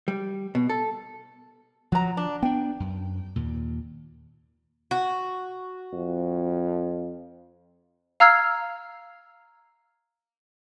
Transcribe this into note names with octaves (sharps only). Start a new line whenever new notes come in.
G3
B2
A4
F3 F#3 A#5
D4
B3 D4 G5
F#2
D#2 A#2
F#4
F2
F5 A#5 E6 F6 G#6 C7